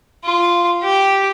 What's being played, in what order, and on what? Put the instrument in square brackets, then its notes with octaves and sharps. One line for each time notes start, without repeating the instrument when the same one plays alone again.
[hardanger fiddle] F4
G4